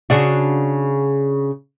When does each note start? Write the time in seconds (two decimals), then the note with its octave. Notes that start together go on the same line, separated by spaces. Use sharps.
0.10 C#3 D4 F#4